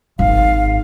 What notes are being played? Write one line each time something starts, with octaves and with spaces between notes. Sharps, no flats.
G#1 F5